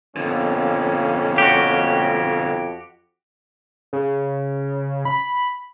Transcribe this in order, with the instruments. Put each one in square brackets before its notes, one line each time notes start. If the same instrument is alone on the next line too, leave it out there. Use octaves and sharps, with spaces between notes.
[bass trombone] F2 [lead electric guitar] B2 D3 [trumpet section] A#3 C#4
[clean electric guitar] F#4 G4
[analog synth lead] C#3
B5